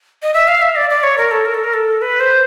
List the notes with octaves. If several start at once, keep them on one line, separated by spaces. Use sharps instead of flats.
D#5
E5
F5
E5
D5
D5
C#5
A#4
A4
A#4
A4
A#4
A4
B4
C5